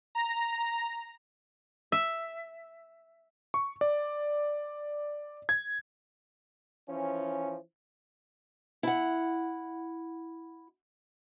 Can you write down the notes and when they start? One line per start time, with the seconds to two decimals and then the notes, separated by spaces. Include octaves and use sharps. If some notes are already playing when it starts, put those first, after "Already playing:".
0.15 A#5
1.92 E5
3.54 C#6
3.81 D5
5.49 G#6
6.88 E3 F3 C#4
8.83 E4 F#5